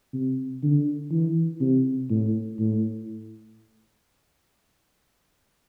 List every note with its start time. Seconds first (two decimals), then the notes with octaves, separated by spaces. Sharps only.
0.14 C3
0.63 D3
1.12 E3
1.61 C3
2.10 A2
2.59 A2